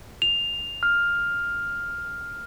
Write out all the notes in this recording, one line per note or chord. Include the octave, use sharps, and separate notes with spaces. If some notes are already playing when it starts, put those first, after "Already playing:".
F7
F6